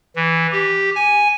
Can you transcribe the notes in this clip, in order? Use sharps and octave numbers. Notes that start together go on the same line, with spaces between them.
E3
G4
G#5